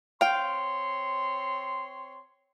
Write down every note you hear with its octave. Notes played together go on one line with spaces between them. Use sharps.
C4 C#5 F5 G5 C6